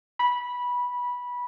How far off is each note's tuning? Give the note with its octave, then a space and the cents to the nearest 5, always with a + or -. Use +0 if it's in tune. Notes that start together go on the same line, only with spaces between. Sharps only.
B5 -15